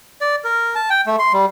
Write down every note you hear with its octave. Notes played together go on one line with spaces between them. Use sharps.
D5
A#4
A5
G5
A3
C6
G3